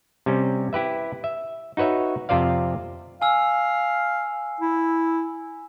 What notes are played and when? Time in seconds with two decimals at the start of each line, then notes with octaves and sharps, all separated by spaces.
0.26 C3 G3 C#4
0.73 E4 G4 B4 E5
1.24 E5
1.77 D#4 F#4 B4 C#5 E5
2.29 F2 C3 F4 C5 D5 F5
3.22 F5 G#5 E6
4.61 E4